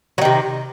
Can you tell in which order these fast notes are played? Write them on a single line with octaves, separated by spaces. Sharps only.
F#3 D#3 C3